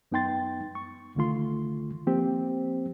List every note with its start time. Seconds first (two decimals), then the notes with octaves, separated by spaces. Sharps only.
0.12 F#2 B3 D#4 G5 C6 A6
0.75 C#6
1.15 C2 D3 D#3 A3 F4 C6
2.07 F3 A#3 C4 G4 C5